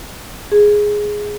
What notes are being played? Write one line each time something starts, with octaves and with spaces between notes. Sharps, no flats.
G#4